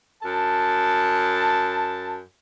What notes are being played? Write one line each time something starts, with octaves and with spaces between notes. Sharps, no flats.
F#2 A5